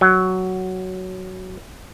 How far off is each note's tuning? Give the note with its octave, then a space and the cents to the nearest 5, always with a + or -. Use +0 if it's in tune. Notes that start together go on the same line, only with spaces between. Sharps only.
F#3 +5